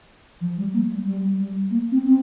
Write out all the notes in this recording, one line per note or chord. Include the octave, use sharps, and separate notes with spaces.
F3
G3
A#3
G3
G3
G3
A#3
C4
C4